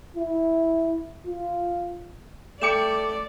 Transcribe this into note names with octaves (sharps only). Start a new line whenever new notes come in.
E4
F4
A3 D5 G5 D6 C#7 E7